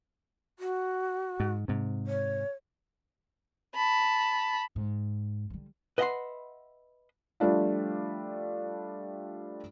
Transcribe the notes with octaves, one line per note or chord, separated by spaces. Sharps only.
F#4
G#2
G#2 C3
C#5
A5 B5
G#2
D3 G3
B4 D#5 E5 F#5 B5 C6
F3 G3 A3 D4 F4